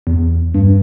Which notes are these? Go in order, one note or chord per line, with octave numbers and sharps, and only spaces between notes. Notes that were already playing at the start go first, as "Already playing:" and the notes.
E2
G2